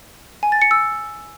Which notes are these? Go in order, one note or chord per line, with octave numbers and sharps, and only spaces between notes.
G#5
A6
C#7
E6